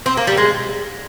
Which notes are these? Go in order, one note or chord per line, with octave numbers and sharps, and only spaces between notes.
C4
A#3
G3
G#3